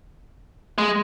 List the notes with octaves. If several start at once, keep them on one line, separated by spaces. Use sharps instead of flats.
G#3